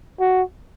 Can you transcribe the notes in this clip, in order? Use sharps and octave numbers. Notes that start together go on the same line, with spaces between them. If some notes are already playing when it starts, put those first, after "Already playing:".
F#4